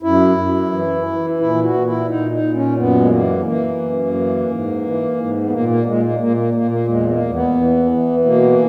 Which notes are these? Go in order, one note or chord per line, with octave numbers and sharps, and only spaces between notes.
F#2 E4
F#2
E3
E3
A#2 E4
F#4
A#2
E4
A#2 D#4
D#4
A#2
C#4
F#2 B3
G#3
E3 A#3
E3 A#3
F#2
E3
G#2
E3
G#2
B3
A#2 A#3
A#3
A#2 G#3
A#3
A#2 A#3
A#3
A#2 A#3
A#3
E2 G#3
A#3
E2
B3
E3
E3
B2 A#3